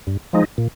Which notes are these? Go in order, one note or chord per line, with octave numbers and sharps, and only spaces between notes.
G2
F3 G#3 D#4
A#2